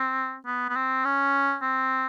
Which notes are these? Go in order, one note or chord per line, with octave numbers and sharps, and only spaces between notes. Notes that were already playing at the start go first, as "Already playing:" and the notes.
Already playing: C4
B3
B3
C4
C#4
C4